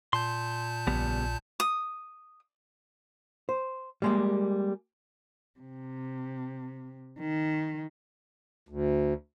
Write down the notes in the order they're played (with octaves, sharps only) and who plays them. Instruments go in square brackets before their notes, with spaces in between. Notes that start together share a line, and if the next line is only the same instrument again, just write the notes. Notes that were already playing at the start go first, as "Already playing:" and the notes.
[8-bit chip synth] A#2 A5 G6 [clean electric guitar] C6
[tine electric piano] A#1 [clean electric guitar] C#3 G3 B3
[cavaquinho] D#6
[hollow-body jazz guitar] C5
G3 G#3 A#3
[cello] C3
D#3
[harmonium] D2